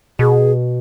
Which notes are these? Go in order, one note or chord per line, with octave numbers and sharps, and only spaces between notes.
B2 G#4